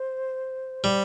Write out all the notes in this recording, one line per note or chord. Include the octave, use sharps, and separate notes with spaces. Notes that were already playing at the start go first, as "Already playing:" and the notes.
Already playing: C5
G3